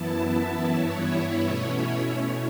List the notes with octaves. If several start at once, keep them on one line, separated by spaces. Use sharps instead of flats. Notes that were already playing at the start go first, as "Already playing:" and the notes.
Already playing: F#2 E3 B3 E4 A5
E5
G2 E3 B3 E4 C#5
B2 A3 C#4 E4